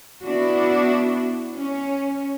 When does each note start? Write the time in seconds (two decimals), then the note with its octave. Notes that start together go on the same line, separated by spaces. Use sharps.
0.24 B3 D4 E4 F#4
1.56 C#4